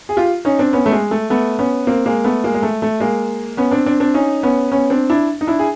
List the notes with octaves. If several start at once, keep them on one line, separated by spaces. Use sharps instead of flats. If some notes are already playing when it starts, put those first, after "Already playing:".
G#4
F4 G4
C#4 D#4
C4 D4
B3 C#4
A3
G#3
A3
A3 B3
B3 C#4
A#3 C4
G#3 A#3
A3 B3
G#3 A#3
G#3
A3
A3
G#3 A#3
B3 C#4
C4 D4
C4 D4
C4 D4
C#4 D#4
B3 C#4
B3 C#4
C4 D4
D4 E4
D#4
D4 E4
G#4